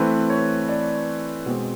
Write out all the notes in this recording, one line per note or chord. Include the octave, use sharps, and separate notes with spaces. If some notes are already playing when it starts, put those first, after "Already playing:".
Already playing: E3 A3 C4 B4
C#5
D5
B2 G#3 C4